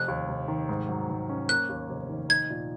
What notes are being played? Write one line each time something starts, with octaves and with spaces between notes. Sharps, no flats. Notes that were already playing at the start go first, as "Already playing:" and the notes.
Already playing: F1 F#6
D#2
F1
D#3
G#2
F#3
G#2
C#4
A#3 F#6
D#2
F1
D#3
D#4 G#6
A#2